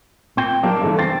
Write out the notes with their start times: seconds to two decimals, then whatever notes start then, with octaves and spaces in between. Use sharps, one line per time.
0.37 A#2 C4 G5
0.63 F#3 A#3 D4
0.81 G2 D3 E3
0.99 C4 A6